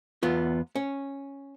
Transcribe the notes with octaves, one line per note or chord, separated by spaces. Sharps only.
E2 B3 F4
C#4